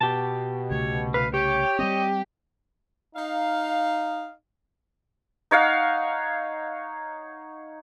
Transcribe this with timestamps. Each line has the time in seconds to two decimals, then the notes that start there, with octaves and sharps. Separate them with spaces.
0.01 B2 G4 A5
0.70 C2 C#3 A3 C#5
1.14 B4 F5
1.34 G4 C#5 G5
1.79 G3 G#3 C4 D#5
3.15 D#4 F5
5.51 D#4 C#5 F5 F#5